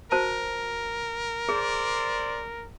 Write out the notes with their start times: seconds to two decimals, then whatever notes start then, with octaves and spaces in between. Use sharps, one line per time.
0.12 F#4 A#4 C5 A5
1.49 G#4 C5 D5